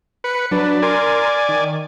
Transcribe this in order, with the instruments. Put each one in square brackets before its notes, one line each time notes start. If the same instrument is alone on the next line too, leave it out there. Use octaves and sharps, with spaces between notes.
[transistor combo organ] B4 [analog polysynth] C#7
[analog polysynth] F#3 B4 [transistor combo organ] D4
[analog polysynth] A#4 C6 [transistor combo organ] D5 G#5
[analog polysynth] D#3